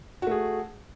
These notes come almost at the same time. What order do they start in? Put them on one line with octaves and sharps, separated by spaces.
F#4 A3 G#4